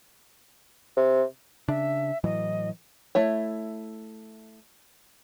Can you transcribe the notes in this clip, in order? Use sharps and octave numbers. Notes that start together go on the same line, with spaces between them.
C3
C#3 D4 E5
A2 E3 F#3 D#5
A3 E4 C#5